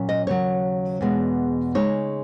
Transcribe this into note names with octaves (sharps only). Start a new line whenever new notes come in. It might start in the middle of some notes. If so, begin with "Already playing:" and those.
Already playing: A#2 F#3 C#4
D#5
D#2 C#3 F#3 C#5
E2 B2 G#3
C#3 G#3 D#4 C#5